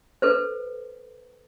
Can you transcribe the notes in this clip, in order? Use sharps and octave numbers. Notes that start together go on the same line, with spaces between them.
A4 B4 C5